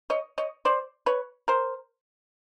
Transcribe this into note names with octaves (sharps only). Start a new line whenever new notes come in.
C#5 D#5
C#5 D#5
C5 D5
B4 C#5
A#4 C5